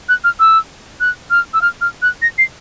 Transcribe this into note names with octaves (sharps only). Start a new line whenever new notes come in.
F#6
F6
E6
F#6
F6
E6
F6
F6
F#6
A#6
C7